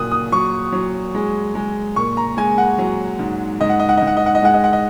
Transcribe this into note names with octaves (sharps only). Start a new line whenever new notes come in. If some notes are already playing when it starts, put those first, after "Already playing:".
Already playing: A#2 F#3 D#6 F#6
D#6
F#3 C#6
F#3
G#3
G#3
A#2 C#6
A#5
G#3 G#5
F#5
F#3
G#2
G#2 D#5
F#5
D#5
F#5
D#5
G#2
F#5
D#5
F#5
D#5
G#3 F#5
D#5
F#5
D#5